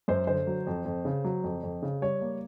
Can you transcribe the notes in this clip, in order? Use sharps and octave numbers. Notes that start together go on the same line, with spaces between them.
F#2 C5
D3 C5
F#3
F2
F2
C#3
F#3
F2
F2
C#3
G3 C#5
A#3